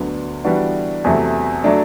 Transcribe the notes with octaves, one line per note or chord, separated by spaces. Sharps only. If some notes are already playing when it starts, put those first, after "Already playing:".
Already playing: D2 D3 F#3 B3 D4
E3 G3 B3 D4 F#4
E2 C3 F#3 A3
F#3 A3 D4